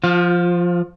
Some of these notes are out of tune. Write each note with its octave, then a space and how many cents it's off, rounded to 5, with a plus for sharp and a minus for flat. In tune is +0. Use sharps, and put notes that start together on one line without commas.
F3 +0 F4 +35